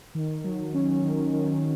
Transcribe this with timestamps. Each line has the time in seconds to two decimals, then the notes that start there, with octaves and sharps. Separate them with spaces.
0.15 D#3
0.44 F#3
0.74 C#4
1.04 D#3
1.33 D#3